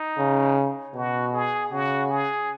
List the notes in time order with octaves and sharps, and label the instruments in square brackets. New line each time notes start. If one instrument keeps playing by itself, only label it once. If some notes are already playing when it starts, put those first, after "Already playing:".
Already playing: [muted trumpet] D#4
[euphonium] C#3
[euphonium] B2 [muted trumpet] F#4
[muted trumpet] G#4
[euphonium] C#3 [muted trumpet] F#4
[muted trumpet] G#4